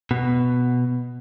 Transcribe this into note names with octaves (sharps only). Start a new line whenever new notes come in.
B2